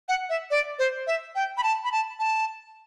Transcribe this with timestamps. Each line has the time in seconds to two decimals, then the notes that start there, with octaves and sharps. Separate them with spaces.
0.09 F#5
0.30 E5
0.51 D5
0.79 C5
1.07 E5
1.35 G5
1.57 B5
1.64 A5
1.84 B5
1.92 A5
2.20 A5